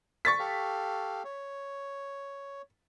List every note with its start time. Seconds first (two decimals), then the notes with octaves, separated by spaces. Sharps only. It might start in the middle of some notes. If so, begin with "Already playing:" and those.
0.25 C#6 A6 B6
0.39 G4 A4 F5
1.24 C#5